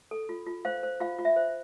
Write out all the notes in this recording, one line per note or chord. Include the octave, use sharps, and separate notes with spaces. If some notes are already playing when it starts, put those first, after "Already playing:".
A4
F4
F4
C5 F5
C5
F4 F5
F4
E5
C5